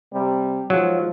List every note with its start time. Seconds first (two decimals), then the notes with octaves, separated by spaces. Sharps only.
0.13 C3 G3
0.70 G#2 F3 F#3